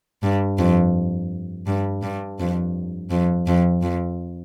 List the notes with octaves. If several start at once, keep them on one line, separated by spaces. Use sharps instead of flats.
G2
F2
G2
G2
F2
F2
F2
F2